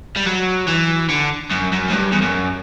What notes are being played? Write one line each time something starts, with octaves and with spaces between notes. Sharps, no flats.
G3
F#3
E3
D3
F#2
F#2
A2
G2
E2
F#2